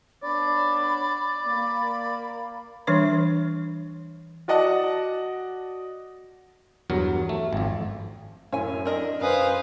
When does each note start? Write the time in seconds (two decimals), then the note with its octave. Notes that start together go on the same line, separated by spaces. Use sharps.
0.23 B3 D4 C#5 D5 B5
1.47 A#3 B5
2.87 E3 G3 D4 B4 C#5 C#6
4.48 F#4 D5 D#5 F#5 A5
6.90 E2 G2 F#3 A#4
7.29 A3
7.53 G#1 F2
8.52 F#2 A2 C#5 G#5
8.85 D4 A#4 D#5
9.21 F#2 B4 C5 F5 G#5 D#6